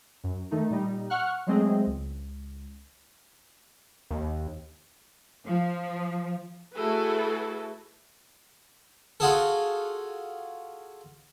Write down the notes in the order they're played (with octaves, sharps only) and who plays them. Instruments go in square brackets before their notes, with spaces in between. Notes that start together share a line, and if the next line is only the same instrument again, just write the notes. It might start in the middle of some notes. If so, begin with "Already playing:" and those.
[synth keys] F#2
D#3 A3 D#4
A#2 G3 D#4
F#5 C#6 F6 F#6
F#3 G#3 A3 C4 G#4 D#5
C#2
[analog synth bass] D#2
[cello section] F3
[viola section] A3 E4 F#4 G#4 A4 B4
[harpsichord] F4 F#4 G#4 A4